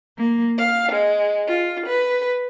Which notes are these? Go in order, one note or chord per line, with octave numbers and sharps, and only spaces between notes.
A#3
F5
G#3
F4
B4